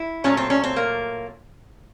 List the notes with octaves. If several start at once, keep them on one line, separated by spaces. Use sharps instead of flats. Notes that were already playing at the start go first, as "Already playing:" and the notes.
Already playing: E4
A#2 F#3 A3 C#4
C4
C#4
C4
A#3